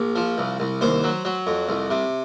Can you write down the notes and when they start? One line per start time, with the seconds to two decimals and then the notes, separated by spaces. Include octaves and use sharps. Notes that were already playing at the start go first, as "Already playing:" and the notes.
Already playing: A#1
0.16 F3
0.38 C2
0.60 C2
0.81 D#2 C5
1.04 F#3
1.25 F#3
1.47 F2
1.69 C2
1.90 C3